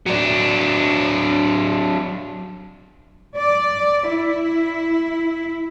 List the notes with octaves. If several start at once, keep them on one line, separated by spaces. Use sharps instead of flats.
F#3 D4
D5
E4